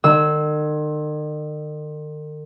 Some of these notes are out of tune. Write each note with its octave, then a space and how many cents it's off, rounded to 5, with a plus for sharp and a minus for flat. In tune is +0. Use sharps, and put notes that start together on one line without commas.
D#3 -45 E6 -15